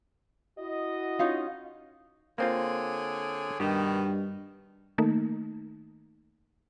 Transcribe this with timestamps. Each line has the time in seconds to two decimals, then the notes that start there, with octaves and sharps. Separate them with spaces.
0.59 E4 F#4 D#5
1.19 C#4 D#4 F4
2.38 D3 A#3 C4 F4 G#4 C#5
3.60 G2 B2 D#3 G4
4.98 D#3 A3 A#3 D#4